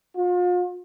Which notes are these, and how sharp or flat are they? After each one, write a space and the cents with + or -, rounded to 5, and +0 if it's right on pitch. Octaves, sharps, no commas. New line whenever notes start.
F4 +40